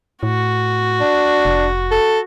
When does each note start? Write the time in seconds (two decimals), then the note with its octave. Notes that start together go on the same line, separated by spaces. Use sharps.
0.23 A2 F#4
1.00 D4
1.45 F1
1.91 A4